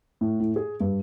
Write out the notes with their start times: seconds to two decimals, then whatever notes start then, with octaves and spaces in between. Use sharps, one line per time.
0.21 A2
0.40 A2
0.56 G#4
0.80 G2